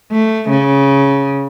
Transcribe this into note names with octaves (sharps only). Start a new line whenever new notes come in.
A3
C#3